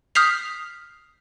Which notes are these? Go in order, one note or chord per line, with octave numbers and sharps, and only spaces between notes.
D#6 F6 G6 B6 C7 F7